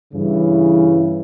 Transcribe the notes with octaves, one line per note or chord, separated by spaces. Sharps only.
G2 C#3 E3